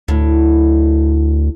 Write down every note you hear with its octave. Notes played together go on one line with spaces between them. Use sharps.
D2 A2